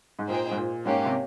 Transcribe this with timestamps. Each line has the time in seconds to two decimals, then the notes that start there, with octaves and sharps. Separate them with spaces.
0.19 G#2
0.28 A#2 D#4 G#4 C5 G5
0.51 G#2
0.57 A#2
0.85 G#2 A#3 C#4 G4
1.05 C3